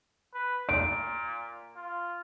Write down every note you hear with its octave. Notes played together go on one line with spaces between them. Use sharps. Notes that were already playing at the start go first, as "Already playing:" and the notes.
B4
A#2 D7
F4